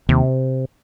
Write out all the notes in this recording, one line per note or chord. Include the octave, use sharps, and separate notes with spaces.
D#2 C3